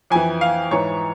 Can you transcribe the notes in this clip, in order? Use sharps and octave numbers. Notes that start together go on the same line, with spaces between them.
F2 E3 G#5
F5
G#2 E3 C#5